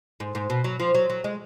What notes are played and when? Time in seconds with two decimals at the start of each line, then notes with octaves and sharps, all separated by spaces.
0.20 G#2
0.35 G#2
0.50 B2
0.64 F#3
0.80 F3
0.95 F#3
1.10 F#3
1.24 G#3